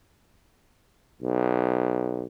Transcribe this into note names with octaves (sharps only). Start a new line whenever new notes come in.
B1